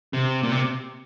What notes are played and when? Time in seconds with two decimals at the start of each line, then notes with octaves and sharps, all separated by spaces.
0.13 C3
0.43 A#2
0.52 C3